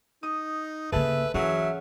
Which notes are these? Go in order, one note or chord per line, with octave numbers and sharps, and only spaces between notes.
D#4 D#6
C#3 A#3 G#4 A4 B4 E5 A5
E3 F#3 C#4 F#4 G#4 E5